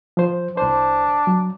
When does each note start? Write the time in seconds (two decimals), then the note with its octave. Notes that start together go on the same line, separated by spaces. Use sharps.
0.17 F3 C5
0.57 C2 D4 C5
1.27 F#3